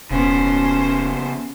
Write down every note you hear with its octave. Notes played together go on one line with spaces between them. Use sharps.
E1 C#3 B3 C#4 C5